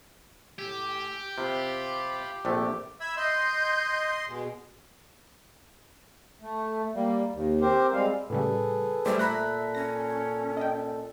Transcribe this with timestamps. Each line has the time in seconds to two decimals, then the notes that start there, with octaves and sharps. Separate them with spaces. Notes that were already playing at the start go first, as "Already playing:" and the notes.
0.59 A2 G4 G#5 E6
1.38 C3 F4 F5 B5
2.45 A#1 C3 A3
3.00 E5 B5 E6 G#6
3.17 D#5 C6 G6
4.28 B2 G#3
6.42 A3
6.95 G3 A#3
7.33 D#2
7.61 C4 G4 A#4 C5
7.93 G3 G#3 C4 F5
8.30 A2 C#3 G3 G#4 A4 B4
9.06 G3 A3 G4 C5 E5
9.19 A#2 A4 E5 A#5 B5 F#6 A#6
9.75 C#4 A#6
10.57 D#5 G5